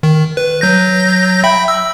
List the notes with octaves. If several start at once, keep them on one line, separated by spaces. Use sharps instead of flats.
D#3
B4
F#3 G6 A#6
E5 G5 B5
E6